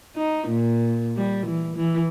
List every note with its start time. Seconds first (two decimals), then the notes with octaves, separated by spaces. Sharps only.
0.16 D#4
0.48 A#2
1.17 G3
1.46 E3
1.76 E3